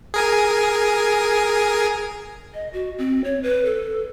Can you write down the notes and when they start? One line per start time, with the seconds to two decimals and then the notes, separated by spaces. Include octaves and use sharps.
0.14 G#4 A#4 G#5
2.54 D#5
2.73 F#4
2.98 C4
3.24 C#5
3.43 B4
3.65 A4